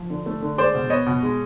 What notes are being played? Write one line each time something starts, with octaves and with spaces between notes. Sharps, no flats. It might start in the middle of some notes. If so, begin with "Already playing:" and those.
Already playing: F3
D3
A3
D3
G#3 C5 D5
B2
B3 C#5 D#5
B2
G#3